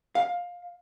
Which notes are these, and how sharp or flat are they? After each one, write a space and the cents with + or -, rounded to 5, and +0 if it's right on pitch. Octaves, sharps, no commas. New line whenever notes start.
F5 +15